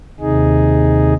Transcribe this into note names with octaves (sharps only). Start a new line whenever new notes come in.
D#2 C3 D#4 G#4